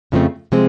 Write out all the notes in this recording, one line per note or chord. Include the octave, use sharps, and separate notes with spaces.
F2 C#3 F3 A3 C4
C3 F3 G#3 C4